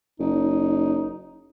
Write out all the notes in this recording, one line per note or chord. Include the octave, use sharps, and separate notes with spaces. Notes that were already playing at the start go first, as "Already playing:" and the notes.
F#1 D#4